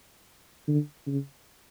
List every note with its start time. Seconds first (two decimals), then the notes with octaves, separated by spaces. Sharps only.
0.68 D3
1.06 C#3